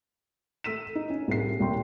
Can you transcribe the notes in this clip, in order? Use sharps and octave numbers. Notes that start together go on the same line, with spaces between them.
A3 E6 B6 D#7 E7
D#4
C#4
C2 A2 G#4 C7
D#1 C2 C3 G5 C6